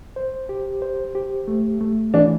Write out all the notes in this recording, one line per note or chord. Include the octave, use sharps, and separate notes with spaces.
C5
G4
C5
G4
A3
A3
E3 D4